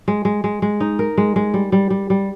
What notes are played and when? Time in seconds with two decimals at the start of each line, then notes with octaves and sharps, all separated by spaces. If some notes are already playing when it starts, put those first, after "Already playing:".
0.08 G#3
0.25 G#3
0.44 G#3
0.62 G#3
0.80 D#4
0.99 A#4
1.18 G#3
1.36 G#3
1.54 G3
1.72 G3
1.90 G3
2.10 G3